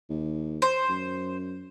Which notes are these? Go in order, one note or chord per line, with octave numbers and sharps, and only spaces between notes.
D#2
C5
F#2